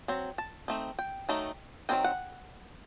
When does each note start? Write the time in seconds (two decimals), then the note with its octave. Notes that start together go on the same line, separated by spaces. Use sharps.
0.08 F#3 C4
0.38 A5
0.68 A3 C4 D#4
0.99 G5
1.29 D#3 F#3 A3 D#4
1.89 D#3 F#3 C4 D#4 G5
2.04 F#5